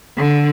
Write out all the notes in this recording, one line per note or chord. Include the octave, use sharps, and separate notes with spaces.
D3